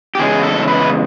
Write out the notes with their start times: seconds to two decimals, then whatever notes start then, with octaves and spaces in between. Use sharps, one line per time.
0.15 G4
0.19 E2 C#3 G#3 G#4
0.43 A4
0.68 B4